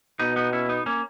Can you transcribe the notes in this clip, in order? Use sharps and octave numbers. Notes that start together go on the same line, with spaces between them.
B2 B3 D#4
B3 D#4
C#4 E4
B3 D#4
A#3 C#4